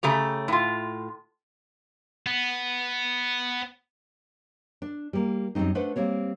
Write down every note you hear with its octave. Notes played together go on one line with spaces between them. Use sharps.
C#3 A3 G4 A#5
A2 F4
B3
D4
G3 A#3
F#2 G3 A3 C4 D#4
A3 D4 B4 C5 F#5
G3 A#3 C4 C#5